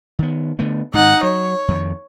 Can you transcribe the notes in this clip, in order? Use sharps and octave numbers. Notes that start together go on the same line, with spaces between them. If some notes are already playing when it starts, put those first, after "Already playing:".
D#3 B3
D3 A3 B3
G#2 D#3 D#4 F#5
F#3 C#5
F2 D#3